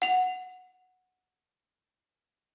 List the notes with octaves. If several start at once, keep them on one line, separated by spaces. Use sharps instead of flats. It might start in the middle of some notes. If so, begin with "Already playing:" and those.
F#5 F7